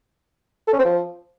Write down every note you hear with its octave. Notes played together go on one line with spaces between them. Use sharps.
A4
C#4
C4
F3